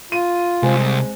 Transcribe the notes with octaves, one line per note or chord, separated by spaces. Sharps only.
F4 D#7
C2 G#3 C4 G#4